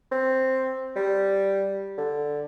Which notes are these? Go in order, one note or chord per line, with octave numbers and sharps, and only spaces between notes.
C4
G3
D3